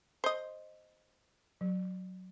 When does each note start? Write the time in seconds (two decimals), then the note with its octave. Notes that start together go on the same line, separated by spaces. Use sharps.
0.24 C5 D#5
1.61 F#3